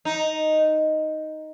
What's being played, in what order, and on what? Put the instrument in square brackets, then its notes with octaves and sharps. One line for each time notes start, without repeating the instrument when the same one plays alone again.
[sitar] D#4